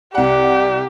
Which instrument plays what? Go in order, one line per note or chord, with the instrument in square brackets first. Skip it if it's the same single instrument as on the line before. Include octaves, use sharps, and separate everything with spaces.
[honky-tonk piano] C2 F#5 [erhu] G4 [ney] D5